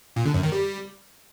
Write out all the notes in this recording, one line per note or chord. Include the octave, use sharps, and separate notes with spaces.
A#2
D3
F#2
D#3
G3